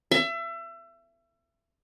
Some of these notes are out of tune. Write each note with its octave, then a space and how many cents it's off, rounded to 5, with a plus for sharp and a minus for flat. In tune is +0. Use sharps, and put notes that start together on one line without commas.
E5 +30